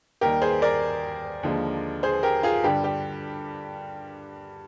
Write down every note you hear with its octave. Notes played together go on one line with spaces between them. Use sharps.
D#2 D#3 G3 G4 A#4
G#4 C5
A#4 D5
D#2 D3 F3 G#3
G#4 C5
G4 A#4
F4 G#4
G2 D3 G3 G4
G4